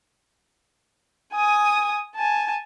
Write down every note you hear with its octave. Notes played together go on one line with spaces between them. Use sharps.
G#5 D#6
G#5 A5